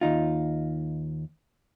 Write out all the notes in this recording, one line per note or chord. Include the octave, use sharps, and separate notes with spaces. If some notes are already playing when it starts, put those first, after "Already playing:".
D#2 D#4 F4